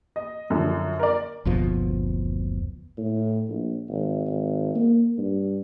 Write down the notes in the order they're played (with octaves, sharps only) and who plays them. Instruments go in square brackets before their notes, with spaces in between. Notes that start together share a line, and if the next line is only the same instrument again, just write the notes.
[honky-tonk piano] D#5
F#2 D3 F3
A#4 D5
[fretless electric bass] F#1 D2 B2 F3
[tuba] A2
A#1
G#1
G#1
A#3
G2